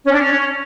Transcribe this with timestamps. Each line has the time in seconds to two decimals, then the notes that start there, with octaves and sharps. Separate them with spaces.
0.04 C#4
0.11 D4
0.19 C#4